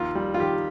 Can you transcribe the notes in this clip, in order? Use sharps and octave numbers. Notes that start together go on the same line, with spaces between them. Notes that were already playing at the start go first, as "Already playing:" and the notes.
Already playing: D#2 F4
G3
F4
D#3 G4